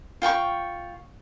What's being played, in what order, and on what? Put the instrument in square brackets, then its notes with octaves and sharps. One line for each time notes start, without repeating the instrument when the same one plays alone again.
[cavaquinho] F4 G5 A#5 C#6